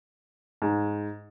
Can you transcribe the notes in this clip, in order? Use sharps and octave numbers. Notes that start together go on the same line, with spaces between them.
G#2